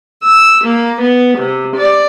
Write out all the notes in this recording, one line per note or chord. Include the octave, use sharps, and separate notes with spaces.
E6
A#3
B3
C3
D5